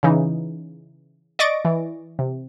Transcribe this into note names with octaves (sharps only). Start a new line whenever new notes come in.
C#3 E3 D#4
D5 D#5 C#6 A6 A#6 D7
E3
C3